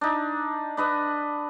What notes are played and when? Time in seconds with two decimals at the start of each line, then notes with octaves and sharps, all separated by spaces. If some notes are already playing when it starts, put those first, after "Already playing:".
0.01 D4 D#4
0.77 D4 B4 D#5